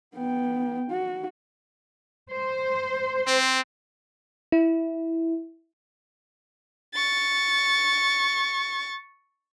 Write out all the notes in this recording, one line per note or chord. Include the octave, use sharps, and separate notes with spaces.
B3 G5
F#4
C5
C4
E4
C#6 A6